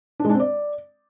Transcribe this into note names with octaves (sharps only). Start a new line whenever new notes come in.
D4
G#3
D4
C4
D5